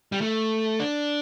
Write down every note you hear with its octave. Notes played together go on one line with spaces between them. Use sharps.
G3
A3
D4